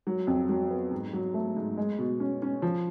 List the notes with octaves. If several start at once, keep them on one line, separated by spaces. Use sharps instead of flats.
F#3
F2
F#3
B3
G#2
F#3
A3
G#2
G#3
B2
C#4
C#4
F3